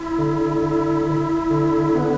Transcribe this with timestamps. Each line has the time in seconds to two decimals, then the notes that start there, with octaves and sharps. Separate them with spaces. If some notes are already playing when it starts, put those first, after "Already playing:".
Already playing: E4
0.18 D3
0.62 E4
1.07 E4
1.51 D3
1.95 B3